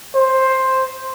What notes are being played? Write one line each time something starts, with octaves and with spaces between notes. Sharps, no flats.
C5